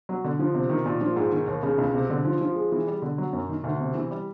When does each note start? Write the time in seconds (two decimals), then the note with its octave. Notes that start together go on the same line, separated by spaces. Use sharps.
0.09 F#3
0.25 D3
0.39 F3
0.55 C3
0.70 D#3
0.86 A#2
1.01 F3
1.16 G#2
1.32 D#3
1.48 D#2
1.63 C#3
1.78 C#2
1.94 C3
2.10 D3
2.25 F3
2.41 F3
2.55 G#3
2.72 E3
2.87 G3
3.02 D3
3.18 F#3
3.33 F#2
3.49 D#3
3.64 D2
3.80 C3
3.95 E3
4.11 G3